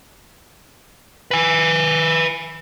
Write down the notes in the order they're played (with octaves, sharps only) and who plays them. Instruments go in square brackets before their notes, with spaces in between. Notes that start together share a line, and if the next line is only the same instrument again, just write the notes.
[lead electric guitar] B4 G#5